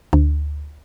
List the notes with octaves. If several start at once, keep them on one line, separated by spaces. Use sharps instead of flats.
D2